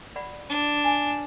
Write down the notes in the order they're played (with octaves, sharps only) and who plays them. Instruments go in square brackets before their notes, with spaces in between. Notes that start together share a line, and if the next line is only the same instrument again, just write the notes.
[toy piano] D5 F#5 B5
[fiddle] D4
[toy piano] G#5